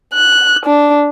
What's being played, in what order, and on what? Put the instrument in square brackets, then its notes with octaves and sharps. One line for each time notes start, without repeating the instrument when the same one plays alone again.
[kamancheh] F#6
D4